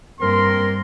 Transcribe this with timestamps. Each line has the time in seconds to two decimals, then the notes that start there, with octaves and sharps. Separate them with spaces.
0.20 G2 A#3 C4 A#4 C6